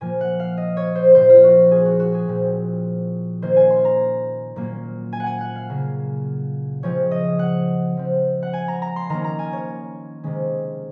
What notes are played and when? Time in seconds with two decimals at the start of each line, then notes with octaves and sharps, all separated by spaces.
0.01 A#2 F3 A#3 G#5
0.21 F#5
0.39 F5
0.57 D#5
0.77 C#5
0.95 C5
1.15 A#2 F3 C4 C5
1.29 F4
1.44 F#4
1.71 G#4
1.85 F#4
1.99 F#4
2.15 G#4
2.28 A#2 F3 C4
3.42 D#3 A#3 C#4 C5
3.56 G#5
3.71 C6
3.85 A#5
4.56 A#2 F#3 A#3 C#4
5.13 G#5
5.20 F#5
5.26 G#5
5.41 F#5
5.55 F5
5.69 C#3 F#3 A#3
6.83 C#3 F3 G#3 C4 C#5
7.11 D#5
7.39 F#5
7.97 F3 C4
8.43 F#5
8.53 G#5
8.68 A#5
8.82 A#5
8.96 C6
9.09 D#3 A#3 C#4 A#5
9.24 A#5
9.39 G#5
9.53 C#5
10.24 C3 D#3 G#3 C#4